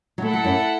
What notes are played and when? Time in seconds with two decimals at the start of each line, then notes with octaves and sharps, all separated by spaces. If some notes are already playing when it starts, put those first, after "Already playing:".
0.18 F#3
0.22 A3 E4 A4 F#5
0.33 F#3
0.44 F#2